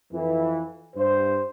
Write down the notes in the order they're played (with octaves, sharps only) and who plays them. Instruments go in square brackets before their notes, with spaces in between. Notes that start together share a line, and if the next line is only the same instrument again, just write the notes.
[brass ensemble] F2 E3
G2 C5